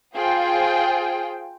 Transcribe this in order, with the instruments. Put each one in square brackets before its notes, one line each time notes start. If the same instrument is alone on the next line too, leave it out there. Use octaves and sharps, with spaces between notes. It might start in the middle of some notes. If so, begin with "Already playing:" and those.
[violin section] F4 G#4 C5 G5